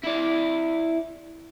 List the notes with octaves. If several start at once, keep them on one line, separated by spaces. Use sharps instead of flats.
E4 D5